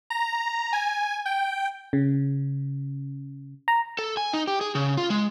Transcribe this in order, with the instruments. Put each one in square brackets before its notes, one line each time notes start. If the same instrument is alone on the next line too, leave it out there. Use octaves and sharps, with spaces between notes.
[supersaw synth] A#5
G#5
G5
[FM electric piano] C#3
A#5
[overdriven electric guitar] A4
G#5
D#4
G4
G#4
C#3
F4
G#3